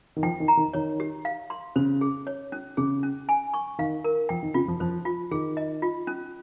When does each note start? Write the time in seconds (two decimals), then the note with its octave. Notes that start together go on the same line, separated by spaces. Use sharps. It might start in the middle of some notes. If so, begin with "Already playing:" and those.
0.16 D#3
0.23 F3 G5
0.40 D#3
0.48 A#5
0.57 D#3
0.73 D#3 C#5
1.00 G4
1.25 F5
1.50 C6
1.76 C#3 C5
2.01 G#4
2.27 C#5
2.52 C#4
2.77 C#3 G#4
3.03 C#4
3.29 G#5
3.54 C#6
3.78 D#3 F5
4.04 A#4
4.29 F3 G5
4.43 D#3
4.54 C#3 F4
4.68 F3
4.80 F3 C5
5.05 F4
5.31 D#3 G#4
5.57 D#5
5.82 F4
6.07 C#4